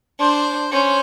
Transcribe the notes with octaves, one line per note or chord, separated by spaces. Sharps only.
D4 C5
C#4 C5